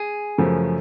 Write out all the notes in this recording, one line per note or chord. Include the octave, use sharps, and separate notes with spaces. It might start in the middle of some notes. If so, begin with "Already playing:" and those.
Already playing: G#4
F#2 C#3 F3 A3